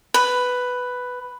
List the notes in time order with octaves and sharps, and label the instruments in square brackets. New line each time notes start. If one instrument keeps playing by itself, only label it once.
[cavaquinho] B4